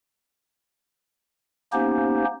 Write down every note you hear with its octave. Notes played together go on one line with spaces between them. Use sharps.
A#3 B3 C#4 D#4 G4 C5